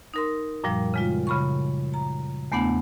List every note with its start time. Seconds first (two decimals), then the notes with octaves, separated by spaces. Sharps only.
0.14 D#4 A#4 C6
0.64 F#2 A#2 F3 G3
0.94 C#3 G#3 F4
1.27 C#3 B5 C#6
1.94 A#5
2.52 E2 A3 B3 D4 F#5